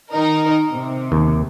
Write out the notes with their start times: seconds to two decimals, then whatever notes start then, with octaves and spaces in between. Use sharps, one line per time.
0.12 D#3 D#4 A#4
0.72 C3
1.12 D#2